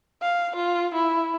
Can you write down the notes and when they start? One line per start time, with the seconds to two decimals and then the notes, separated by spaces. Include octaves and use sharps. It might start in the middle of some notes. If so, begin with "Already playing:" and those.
0.22 F5
0.56 F4
0.94 E4